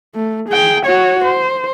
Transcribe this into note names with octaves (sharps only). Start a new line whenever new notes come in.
A3
G#4 G5
F#4 C#5
C5